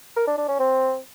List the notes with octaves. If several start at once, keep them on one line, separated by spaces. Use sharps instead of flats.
A#4
D4
D4
C#4
C4